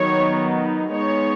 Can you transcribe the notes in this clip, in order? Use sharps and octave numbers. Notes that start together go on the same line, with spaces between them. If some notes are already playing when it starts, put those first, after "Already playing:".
Already playing: D#3 F#3 B3 D#4 C#5
G#3 B3 D#4 C#5